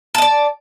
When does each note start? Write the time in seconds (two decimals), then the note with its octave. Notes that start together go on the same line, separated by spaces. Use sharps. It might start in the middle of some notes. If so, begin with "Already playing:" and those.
0.15 A5
0.18 D#5
0.22 D5